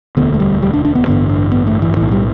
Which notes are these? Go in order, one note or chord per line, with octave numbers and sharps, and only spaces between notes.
E1 D2 D3 B3
A3
G3
G3
D4
D4
B3
A1 G2 D3 B3
D4
B3
A3
E3
B1 A2 E3
G3